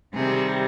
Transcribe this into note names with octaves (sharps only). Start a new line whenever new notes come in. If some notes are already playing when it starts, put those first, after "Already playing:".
C3 D#3 G3 C4 G#4